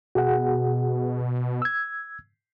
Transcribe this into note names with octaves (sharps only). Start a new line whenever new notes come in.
B2 F#4 G#4 F#5
E6 G#6